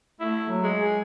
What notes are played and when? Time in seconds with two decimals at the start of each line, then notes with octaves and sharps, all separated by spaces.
0.20 A3 E4
0.49 F#3
0.63 G#3
0.78 G#4